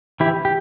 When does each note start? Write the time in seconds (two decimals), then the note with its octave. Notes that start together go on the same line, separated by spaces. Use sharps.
0.20 E3 E4 G4
0.45 G4